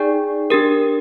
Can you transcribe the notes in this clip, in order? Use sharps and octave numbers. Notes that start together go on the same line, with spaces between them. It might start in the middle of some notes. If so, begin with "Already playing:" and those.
Already playing: D#4 G#4 D5 G5
D4 G4 A#4